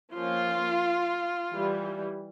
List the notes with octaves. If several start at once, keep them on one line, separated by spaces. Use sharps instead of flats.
F3 A#3 C#4 F4
E3 G3